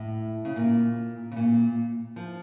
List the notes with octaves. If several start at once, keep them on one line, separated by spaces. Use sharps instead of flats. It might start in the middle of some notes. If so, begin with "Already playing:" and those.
Already playing: A2
C#3
A#2
C#3
A#2
F3